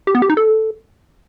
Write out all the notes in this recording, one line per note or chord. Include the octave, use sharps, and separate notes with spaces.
G4
B3
G4
D#4
A4